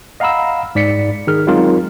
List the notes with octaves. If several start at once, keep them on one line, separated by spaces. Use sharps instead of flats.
D#5 F5 F#5 A#5 B5 E6
G#2 D5 B6 C#7
D#3 G#4 F6
F#3 G#3 C4 D#4 F4 A#4